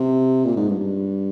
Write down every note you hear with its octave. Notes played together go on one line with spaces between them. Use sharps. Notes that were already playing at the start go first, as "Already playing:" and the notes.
Already playing: C3
A#2
G#2
G2
G2